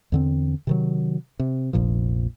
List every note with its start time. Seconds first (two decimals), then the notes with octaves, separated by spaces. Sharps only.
0.12 E2 D3 C4
0.67 C3 D#3 F#3
1.39 C3
1.73 F1 A#1 A#2 F3